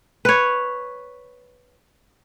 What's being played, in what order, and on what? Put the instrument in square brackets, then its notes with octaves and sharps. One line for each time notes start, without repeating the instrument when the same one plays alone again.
[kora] B4 C#5